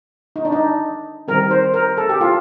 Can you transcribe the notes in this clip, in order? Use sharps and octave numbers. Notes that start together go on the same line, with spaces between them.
D#4
D4
D#4
D#3 G3 C4 A#4
C5
A#4
A4
G4
F4